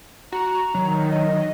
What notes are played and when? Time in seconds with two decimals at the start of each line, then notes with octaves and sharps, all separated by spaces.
0.32 F#4 A#5
0.75 D#3 F#3
1.11 D#5